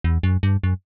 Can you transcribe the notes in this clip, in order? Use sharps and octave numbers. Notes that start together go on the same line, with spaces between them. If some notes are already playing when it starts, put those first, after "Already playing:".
E2
F#2
G2
F#2